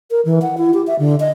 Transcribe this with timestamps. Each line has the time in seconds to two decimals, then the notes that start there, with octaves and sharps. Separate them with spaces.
0.11 A#4
0.25 E3
0.42 F#5
0.58 E4
0.74 G4
0.87 E5
0.99 D3
1.20 D#5